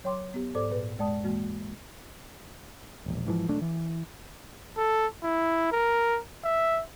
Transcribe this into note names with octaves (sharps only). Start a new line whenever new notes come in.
F#3 C#5 G5 C6 D6
B3 G4
G#2 A4 C5 D5 D6
A#2 G#4 B4
E2 G#3 D5 A5 D#6
E3 G#3 A#3 F#4
E1 A#1
G#2 E3 F3
E1 B1 A3 D4
E3
A4
E4
A#4
E5